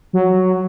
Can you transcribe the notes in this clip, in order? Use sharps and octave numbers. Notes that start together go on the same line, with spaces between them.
F#3